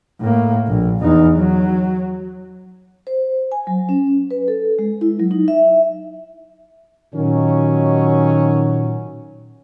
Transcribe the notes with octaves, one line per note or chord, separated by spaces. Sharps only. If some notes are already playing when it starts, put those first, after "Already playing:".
A2 A#3
A#1
E2 D#4
F#3
C5
G#5
F#3
C#4
B4
A4
G#3
E4
F#3
D#4
E5
A#2 D#3 F#3 C#4